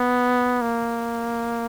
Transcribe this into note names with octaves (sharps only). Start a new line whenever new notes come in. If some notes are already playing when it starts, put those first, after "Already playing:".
Already playing: B3
A#3